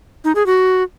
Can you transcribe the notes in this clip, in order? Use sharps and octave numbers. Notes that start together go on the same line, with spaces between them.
D#4
G#4
F#4